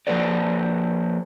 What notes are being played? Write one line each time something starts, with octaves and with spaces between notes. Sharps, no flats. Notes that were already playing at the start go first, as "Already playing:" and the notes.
F3 A#3 A4 B4 D5